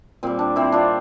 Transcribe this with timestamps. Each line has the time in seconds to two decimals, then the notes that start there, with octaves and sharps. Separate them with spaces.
0.23 A#2 G3 C4
0.39 D4
0.56 C4 E4
0.72 D4 F4